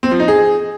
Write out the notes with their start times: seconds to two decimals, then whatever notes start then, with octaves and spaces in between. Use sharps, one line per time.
0.03 C4
0.11 F3
0.20 D#4
0.28 G#4